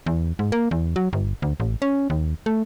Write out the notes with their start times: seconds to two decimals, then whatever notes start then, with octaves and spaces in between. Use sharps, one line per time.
0.06 E2
0.39 G#2
0.52 A#3
0.71 E2
0.96 F#3
1.13 G1
1.42 D2
1.60 A1
1.82 C#4
2.10 D#2
2.46 A3